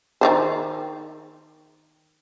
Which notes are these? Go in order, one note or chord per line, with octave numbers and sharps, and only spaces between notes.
D#3 E3 C5